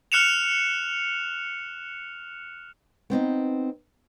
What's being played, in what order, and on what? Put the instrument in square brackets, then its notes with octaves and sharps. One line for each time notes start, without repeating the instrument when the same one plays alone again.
[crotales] F6 F#6 C#7 E7 F7
[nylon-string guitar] B3 C4 D4 D#4